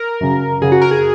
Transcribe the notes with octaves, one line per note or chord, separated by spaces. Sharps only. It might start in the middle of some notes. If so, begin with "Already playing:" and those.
Already playing: A#4
F#2 C#3
F#2 C#3 G#4
F#4
A#4
G#4